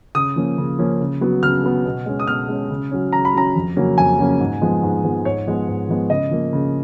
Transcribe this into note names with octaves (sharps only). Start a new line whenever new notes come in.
C#3 D#6
F3 A#3 C#4
C#3
F3 A#3 C#4
C#3
F#3 B3
C#3 F6
F#3 B3
B2
G#3 C#4
D#6
B2 F6
G#3 C#4
C#3
F#3 C#4
C#3 A#5
B5
F#3 C#4 A#5
F2
C#3 F#3 A#3 C#4
F2 G#5
C#3 F#3 A#3 C#4
G#2
F3 G#3 B3
G#2
F3 G#3 B3
G#2 C#5
F3 G#3 B3
G#2
F3 G#3 B3
C#3 D#5
F3 A#3
C#3